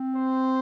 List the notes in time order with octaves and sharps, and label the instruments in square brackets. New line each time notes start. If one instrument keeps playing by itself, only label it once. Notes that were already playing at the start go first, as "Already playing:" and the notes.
Already playing: [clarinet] C4
[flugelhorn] C5